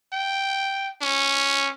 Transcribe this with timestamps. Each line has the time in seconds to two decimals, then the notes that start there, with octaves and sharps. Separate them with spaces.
0.13 G5
1.02 C#4